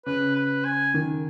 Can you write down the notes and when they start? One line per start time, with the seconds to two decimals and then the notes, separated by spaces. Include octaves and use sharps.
0.06 C#3 B4
0.36 B4
0.64 G#5
0.94 D#3